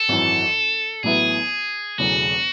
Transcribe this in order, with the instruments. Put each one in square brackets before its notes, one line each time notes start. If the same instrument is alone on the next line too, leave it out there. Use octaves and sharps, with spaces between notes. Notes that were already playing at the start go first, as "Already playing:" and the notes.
Already playing: [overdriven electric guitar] A4
[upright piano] G#1 F#2 E3
[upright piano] A1 A2 F#3 B3 E4 [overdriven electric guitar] G#4
[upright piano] E1 E2 C#3 F#3 A3 [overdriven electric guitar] F#4